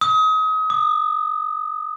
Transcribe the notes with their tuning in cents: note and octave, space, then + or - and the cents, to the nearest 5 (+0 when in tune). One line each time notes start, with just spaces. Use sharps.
D#6 +30
D#6 -35